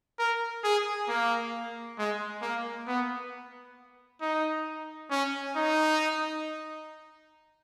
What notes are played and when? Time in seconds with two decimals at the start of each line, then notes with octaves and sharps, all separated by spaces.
0.19 A#4
0.64 G#4
1.09 A#3
1.98 G#3
2.42 A#3
2.87 B3
4.22 D#4
5.11 C#4
5.56 D#4